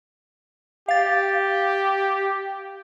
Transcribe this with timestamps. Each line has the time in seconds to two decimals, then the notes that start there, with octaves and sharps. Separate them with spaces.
0.88 G4 F5 A6